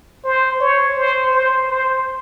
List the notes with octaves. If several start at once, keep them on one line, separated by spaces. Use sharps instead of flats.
C5
C#5
C5
C5
C5